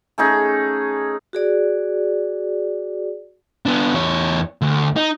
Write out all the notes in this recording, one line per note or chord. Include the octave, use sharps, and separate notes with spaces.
A3 C#4 D#4 G#4
F#4 G#4 D5
B3 D4
E2 C#5
D2
D#4